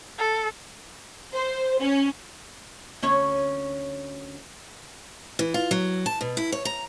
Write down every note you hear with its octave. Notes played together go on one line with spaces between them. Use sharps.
A4
C5
C#4
D2 C#4 C#5
E3
F4
F#3
A5
B2
E4
C#5
A#5